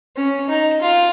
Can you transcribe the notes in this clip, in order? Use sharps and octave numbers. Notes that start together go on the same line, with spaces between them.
C#4
D#4
F4